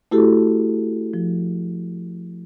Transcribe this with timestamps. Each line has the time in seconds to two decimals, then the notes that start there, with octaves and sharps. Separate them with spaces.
0.12 A3 E4 F#4 G4 A4
1.14 F3